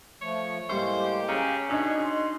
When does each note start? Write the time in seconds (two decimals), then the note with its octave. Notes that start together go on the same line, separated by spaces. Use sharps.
0.21 F3 A3 C#5
0.69 A2 G3 G#3 A#3 C5 C#6
1.00 G4
1.29 C#3 C#4 A#5
1.69 B2 D4 D#4 G#4
2.03 C6